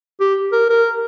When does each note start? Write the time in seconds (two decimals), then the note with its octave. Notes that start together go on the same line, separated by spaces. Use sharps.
0.20 G4
0.52 A#4
0.69 A#4